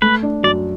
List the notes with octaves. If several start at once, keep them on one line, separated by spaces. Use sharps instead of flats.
A3 B4
D4
F#2 D5